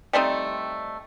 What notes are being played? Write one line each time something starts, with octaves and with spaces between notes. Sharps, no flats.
G3 A3 C4 D#4